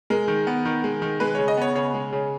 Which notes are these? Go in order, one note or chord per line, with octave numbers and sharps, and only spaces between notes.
G#3 A#4
D#3
B3
D#3
G#3
D#3
G#3 B4
C#3 C#5
D#5
B3 C#5
C#3 C#5
G#3
C#3